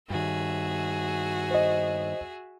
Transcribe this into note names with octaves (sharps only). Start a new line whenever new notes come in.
G2 D#3 F#4 G#4 E5
C5 D#5